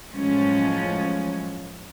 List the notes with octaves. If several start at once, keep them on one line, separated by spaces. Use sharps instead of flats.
A2 F3 F#3 G#3 C#4